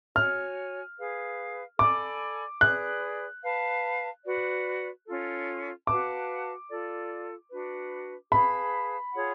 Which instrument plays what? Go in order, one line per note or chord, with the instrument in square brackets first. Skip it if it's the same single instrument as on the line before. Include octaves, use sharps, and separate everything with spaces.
[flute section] F#4 C#5 G#5 [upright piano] F6
[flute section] G#4 B4 F5
[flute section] A4 D5 G#5 B5 [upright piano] D6
[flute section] G#4 B4 D5 [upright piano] F#6
[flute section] B4 F5 A5
F#4 B4 D5
C#4 F4 A4
[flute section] F#4 B4 F5 A5 [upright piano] D6
[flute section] F4 A4 D5
D4 F#4 B4
[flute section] G#4 B4 F5 A5 [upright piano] B5
[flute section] F4 G#4 C#5 F#5